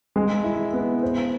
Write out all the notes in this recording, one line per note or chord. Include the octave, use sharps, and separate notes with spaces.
G#3
E4
B3
C5